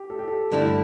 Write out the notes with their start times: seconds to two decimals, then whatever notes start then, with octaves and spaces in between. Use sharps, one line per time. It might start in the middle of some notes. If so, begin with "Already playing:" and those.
Already playing: G4
0.10 A4
0.19 G4
0.28 A4
0.52 G2 D3 A3 E4 A4